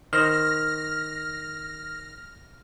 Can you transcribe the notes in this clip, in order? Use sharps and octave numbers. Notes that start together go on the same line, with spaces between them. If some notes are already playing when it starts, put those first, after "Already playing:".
D#3 C5 F6 A#6